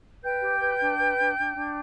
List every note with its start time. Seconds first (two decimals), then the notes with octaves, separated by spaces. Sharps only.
0.23 B4 G5 G6
0.43 G4
0.61 B4
0.80 D4
0.99 B4
1.18 D4
1.38 D4
1.56 D4